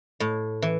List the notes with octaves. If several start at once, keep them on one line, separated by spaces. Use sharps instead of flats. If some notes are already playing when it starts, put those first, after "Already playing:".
A2
E3